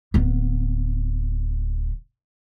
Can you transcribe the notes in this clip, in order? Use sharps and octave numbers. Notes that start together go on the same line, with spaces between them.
D1 B3